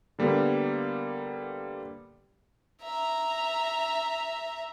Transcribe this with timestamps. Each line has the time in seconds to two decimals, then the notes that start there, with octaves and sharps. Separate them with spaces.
0.19 D3 G3 A#3 B3
2.82 E5 A#5